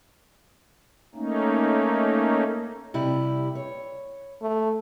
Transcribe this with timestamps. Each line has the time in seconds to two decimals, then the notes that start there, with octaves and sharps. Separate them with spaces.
1.15 A3 A#3 C#4 D#4
2.94 C3 G3 E4
3.55 C#5
4.42 A3